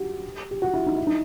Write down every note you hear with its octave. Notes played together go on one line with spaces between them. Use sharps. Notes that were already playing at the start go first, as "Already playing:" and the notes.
Already playing: F#4 G4
G4
F#4
E4
D#4
E4
D#4